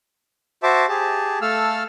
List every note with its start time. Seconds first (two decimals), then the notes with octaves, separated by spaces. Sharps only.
0.63 F#4 C5 E5 A5 D6
0.89 G4 G#4 A5
1.41 A3 A4 F5 E6 F6